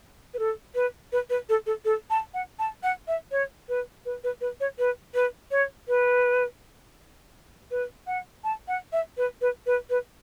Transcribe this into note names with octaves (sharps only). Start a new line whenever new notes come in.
B4
A4
B4
B4
B4
A4
A4
A4
A5
F#5
A5
F#5
E5
C#5
B4
B4
B4
B4
C#5
B4
B4
C#5
B4
B4
F#5
A5
F#5
E5
B4
B4
B4
B4